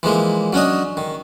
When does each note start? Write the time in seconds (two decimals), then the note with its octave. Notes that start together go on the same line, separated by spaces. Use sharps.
0.03 E3 F3 G#3 A#3
0.53 F#3 C#4 D4 D#5
0.97 D#3